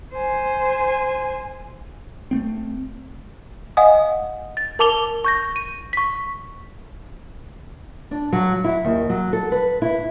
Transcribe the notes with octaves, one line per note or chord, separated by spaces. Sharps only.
C5 G#5
A3 B3 C4
D#5 F5 F#5 G#5 D#6
A6
A#4 A5 D6 F7 G7
C#6 G6 A#6
D#7
C#6 B6
D4
F#3
E4
D#2
F#3
A4
B4
E4